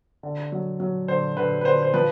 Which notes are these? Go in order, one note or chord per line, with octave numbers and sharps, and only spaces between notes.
D3
F#3
F#3
D3 C5
D3 B4
B4
D3 C5
C5
F3 B4